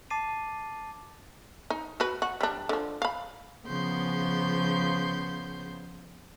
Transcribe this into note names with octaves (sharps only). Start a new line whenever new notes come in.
A5 D6 A6 C7 D#7
D#4
F#4 B4
F#4
G3 D4
D3 F3
F5 B5
C#3 F3 B3 C6 G6